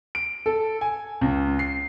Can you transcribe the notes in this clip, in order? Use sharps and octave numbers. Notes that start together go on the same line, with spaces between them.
D7
A4
G#5
C#2
C7